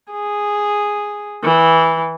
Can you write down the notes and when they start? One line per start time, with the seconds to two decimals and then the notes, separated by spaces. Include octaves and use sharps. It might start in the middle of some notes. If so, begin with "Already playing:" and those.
0.12 G#4
1.44 E3